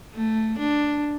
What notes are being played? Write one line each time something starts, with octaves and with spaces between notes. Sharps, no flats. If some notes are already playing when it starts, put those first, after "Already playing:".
A3
D4